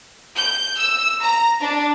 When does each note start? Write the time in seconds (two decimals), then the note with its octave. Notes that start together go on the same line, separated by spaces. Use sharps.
0.36 G6
0.77 E6
1.22 A#5
1.61 D4